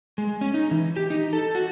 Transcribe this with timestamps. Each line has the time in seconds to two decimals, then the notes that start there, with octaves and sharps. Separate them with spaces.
0.18 G#3
0.41 C#4
0.54 D#4
0.71 E3
0.96 G4
1.10 D#4
1.33 A4
1.55 F#4